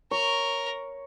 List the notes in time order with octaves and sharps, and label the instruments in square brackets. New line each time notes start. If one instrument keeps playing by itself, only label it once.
[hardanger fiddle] A#4 [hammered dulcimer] C#5